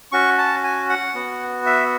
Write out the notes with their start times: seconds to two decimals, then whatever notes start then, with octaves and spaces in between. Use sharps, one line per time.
0.12 C#4 F#4 C#6
0.38 A5
0.64 G#5
0.89 F#5
1.15 B3 F#4
1.66 E5